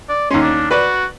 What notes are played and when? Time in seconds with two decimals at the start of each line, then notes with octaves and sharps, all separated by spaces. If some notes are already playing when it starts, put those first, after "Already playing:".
0.09 D5
0.30 D#2 C#4 C6
0.42 D4
0.71 F#4 B4 D5